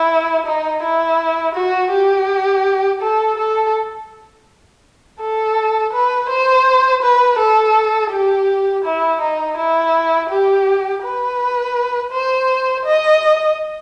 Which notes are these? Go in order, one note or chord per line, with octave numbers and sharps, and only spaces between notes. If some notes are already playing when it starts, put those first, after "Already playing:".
Already playing: E4
D#4
E4
F#4
G4
A4
A4
A4
B4
C5
B4
A4
G4
E4
D#4
E4
G4
B4
C5
D#5